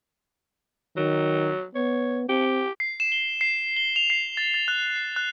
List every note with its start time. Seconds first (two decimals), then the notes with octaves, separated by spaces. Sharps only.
0.97 D#3 F#3
1.75 B3 C#5
2.29 C4 G4
2.80 C7
3.00 E7
3.12 G7
3.41 C7
3.77 G7
3.96 F7
4.10 C7
4.37 A6
4.54 A6
4.68 F#6
4.96 C7
5.16 F#6